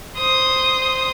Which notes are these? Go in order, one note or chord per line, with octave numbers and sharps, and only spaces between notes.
C5 D#6